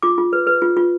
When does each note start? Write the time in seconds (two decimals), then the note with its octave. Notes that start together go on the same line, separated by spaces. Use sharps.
0.02 F4 D6
0.18 F4
0.33 B4
0.47 B4
0.62 F4
0.77 F4